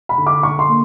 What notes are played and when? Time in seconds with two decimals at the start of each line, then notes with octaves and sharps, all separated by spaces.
0.09 B5
0.18 D3
0.27 D6
0.43 D3 C#6
0.59 C6
0.68 A#3